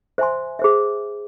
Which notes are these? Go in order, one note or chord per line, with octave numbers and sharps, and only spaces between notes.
C5 E5 G#5 C6
G#4 C5 E5